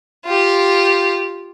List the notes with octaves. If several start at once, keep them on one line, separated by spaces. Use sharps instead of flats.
F4 G4